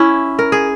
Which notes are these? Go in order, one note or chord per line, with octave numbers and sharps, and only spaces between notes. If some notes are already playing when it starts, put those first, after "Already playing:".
Already playing: C#4 E4
A#4
G#4